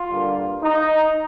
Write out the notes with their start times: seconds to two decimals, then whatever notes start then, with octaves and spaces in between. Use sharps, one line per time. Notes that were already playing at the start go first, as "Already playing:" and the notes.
Already playing: F4
0.10 G2 D3 G3 A#3
0.62 D#4